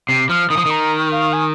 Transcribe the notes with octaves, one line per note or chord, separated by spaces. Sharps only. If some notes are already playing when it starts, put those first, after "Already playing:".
C3 C7
F3 F6
D#3 D#6
F3
D#3 A#5
F5
G#5